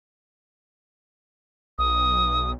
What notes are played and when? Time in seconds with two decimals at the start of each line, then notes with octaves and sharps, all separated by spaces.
1.78 B1 D#6